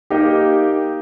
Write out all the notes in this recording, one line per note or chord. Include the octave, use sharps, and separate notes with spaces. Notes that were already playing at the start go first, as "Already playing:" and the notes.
A#3 D#4 G4